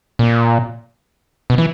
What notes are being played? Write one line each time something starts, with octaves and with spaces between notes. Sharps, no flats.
A#2
B2
E3